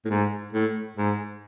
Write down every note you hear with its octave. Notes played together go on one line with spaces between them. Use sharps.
A2
G#2
A2
G#2